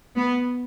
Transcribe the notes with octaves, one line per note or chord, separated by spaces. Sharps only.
B3